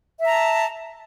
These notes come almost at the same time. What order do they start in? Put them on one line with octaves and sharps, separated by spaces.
E5 A#5 A5